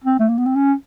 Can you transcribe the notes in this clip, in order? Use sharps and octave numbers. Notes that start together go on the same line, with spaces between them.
C4
A3
A#3
B3
C4
C#4